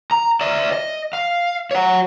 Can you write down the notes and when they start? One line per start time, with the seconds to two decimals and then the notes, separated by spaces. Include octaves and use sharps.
0.11 A#5
0.41 D5 E5
0.72 D#5
1.13 F5
1.71 C#5 F#5